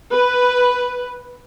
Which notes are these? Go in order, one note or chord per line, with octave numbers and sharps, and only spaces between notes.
B4